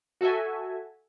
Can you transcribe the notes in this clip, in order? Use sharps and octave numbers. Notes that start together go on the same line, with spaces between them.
F#4 A4 E5 G#5